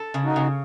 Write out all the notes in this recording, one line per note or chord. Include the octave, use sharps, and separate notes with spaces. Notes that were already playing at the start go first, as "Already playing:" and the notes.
Already playing: A4
C#3
D#4 F#4
C#3